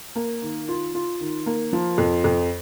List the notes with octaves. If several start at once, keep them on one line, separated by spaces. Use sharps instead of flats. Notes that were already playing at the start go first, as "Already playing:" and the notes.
A#3
D#3
F4
F4
D#3
A#3
F3
F2
F2